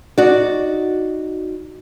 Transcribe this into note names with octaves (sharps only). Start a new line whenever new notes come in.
D#4 F#4 D5